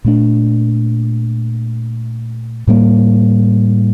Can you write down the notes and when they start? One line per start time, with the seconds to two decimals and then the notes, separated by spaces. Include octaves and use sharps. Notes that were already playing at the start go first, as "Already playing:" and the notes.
0.05 A#2 A3 D4
2.67 A2 G3 A#3